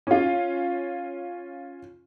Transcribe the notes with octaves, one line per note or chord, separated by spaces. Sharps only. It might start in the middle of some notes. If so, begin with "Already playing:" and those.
C#4 F4